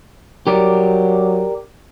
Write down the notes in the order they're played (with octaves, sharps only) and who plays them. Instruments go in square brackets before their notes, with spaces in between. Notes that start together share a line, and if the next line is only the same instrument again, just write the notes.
[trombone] F#3 [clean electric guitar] G4 A#4 D5